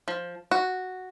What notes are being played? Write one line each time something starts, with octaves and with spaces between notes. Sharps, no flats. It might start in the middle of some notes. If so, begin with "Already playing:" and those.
F3
F#4